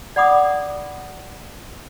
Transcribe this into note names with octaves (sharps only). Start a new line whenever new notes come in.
D5 F#5 B5 D6 D#6